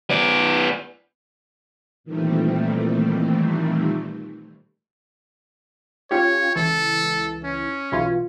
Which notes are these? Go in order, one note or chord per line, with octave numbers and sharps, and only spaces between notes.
B3 D5
A#2 D#3 E3 G3 A3 C4
C#4 F4 G4 C#5
C#2 E3 A4
C#4
B1 E3 F4